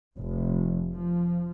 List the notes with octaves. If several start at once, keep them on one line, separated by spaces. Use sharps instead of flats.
F1
F3